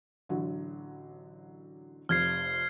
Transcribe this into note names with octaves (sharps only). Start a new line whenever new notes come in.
A1 D3 F#3
F1 F2 F6 G#6 C7